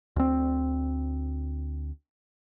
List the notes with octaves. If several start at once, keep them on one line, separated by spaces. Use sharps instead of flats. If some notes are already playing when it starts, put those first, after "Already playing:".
D2 C4